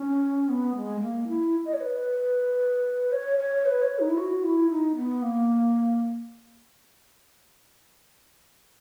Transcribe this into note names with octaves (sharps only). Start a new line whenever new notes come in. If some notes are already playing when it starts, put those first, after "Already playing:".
Already playing: C#4
B3
G#3
A#3
E4
D#5
C#5
B4
C#5
C#5
B4
C#5
D#4
E4
F#4
E4
D#4
B3
A#3